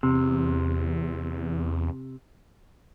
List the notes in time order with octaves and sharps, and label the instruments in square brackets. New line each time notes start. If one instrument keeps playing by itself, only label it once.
[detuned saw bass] E2 [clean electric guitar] C3